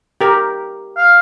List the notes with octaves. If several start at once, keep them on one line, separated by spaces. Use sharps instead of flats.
G4 A#4
F5